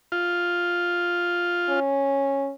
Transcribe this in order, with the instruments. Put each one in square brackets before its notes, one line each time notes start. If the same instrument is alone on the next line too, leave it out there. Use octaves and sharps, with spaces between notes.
[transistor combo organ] F4
[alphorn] C#4